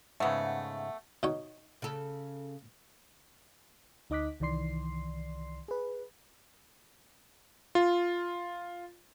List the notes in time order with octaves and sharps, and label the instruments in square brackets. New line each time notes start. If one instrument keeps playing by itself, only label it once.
[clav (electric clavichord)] G#2 C#3 [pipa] A3 B3 [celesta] E5 F#5
[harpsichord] B2 D#4 C#5
[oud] C#3 A4
[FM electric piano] D2 D#4 D#5 D6 F#6 B6
C2 D#3 E3 D5 C6 C7
G#4 B4
[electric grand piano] F4